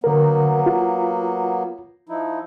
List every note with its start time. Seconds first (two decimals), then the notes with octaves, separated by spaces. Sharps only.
0.04 D3 F#3 A#3 B3 A#4
0.66 F4
2.09 F3 D#4 E4